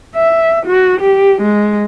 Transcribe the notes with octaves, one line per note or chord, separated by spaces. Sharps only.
E5
F#4
G4
G#3